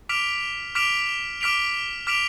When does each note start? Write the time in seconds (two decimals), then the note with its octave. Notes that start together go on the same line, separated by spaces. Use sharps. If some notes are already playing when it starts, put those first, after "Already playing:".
0.09 D6 F6 B6 D7 F7
0.75 D6 F6 B6 D7 F7
1.41 D6 F6 B6 D7 F7
2.07 D6 F6 B6 D7 F7